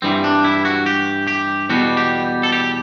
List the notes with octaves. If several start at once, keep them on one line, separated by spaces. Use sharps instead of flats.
G2 E3 G3 C4
D4
E4
F#4
G4
G4
E2 B2 G3 F#4
G4
A4
G4